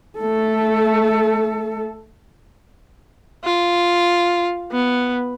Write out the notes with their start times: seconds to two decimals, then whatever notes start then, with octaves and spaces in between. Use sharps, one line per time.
0.19 A3 A4
3.45 F4
4.72 B3